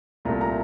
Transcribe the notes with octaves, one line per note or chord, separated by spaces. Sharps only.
C2 A#2 A3 A#5
A#5